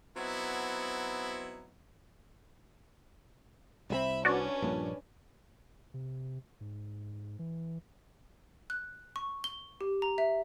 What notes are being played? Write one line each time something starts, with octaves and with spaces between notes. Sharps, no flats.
F#3 B3 C4 D#4 E4
C2 G3 C4 E5 B5
C#4 D4 F#4 B4 D5
A#1 G2 A#2
C3
G#2
E3
F#6
C#6
G7
G4
A#5
E5